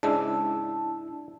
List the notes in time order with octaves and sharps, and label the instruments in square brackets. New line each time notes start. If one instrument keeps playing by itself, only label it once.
[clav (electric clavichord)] G#2 C#3 G#3 [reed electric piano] D4 E4 E6 [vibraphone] A5